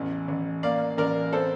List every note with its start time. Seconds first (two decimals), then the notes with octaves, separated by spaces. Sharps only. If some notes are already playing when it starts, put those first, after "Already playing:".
Already playing: A1 E2
0.28 A1
0.63 A#3 D5 F5
0.98 A1 A#4 D5
1.32 C4 A4 C5